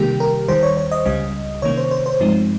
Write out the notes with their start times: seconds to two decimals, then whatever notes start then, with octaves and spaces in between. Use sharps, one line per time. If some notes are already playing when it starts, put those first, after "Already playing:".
Already playing: C3 D#3 G3 A#3 G4
0.20 A#4
0.48 D#2 D#3 G3 C5
0.63 C#5
0.77 C#5
0.91 D#5
1.05 C#2 C#3 G3 C#4 D#5
1.62 C3 D#3 A#3 C#4 C#5
1.77 C5
1.91 C5
2.06 C5
2.20 G2 F3 G#3 C4 D#4